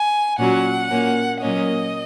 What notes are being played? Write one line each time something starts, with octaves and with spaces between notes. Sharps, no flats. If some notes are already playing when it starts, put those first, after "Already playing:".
Already playing: G#5
A#2 F#3 C#4 F#5
A#2 A#3 C#4
A#2 F#3 A#3 C#4 D#5